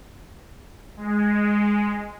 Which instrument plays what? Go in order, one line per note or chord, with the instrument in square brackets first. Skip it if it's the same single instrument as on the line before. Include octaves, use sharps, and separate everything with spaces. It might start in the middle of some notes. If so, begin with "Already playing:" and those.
[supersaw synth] G#3